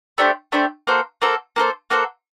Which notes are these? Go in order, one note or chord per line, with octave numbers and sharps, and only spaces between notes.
A3 D4 G4 C5
A3 D4 G4 C5
A#3 F#4 A4 C5
A#3 F#4 A4 C5
A#3 F#4 A4 C5
A#3 F#4 A4 C5